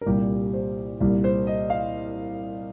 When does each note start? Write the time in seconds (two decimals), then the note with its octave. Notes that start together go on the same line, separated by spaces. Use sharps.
0.01 A#4
0.06 C2 A#2 G3 G4
0.53 C5
1.00 C2 A#2 G3
1.24 C5
1.47 D#5
1.70 F5